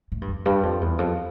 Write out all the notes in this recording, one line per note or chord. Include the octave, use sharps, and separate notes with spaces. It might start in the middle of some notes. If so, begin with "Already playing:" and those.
A2
G2
F2
G2
F2
E2
F2